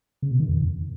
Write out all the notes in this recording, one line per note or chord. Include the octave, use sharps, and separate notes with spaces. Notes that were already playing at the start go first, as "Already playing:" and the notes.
C#3
B2
D#3
F2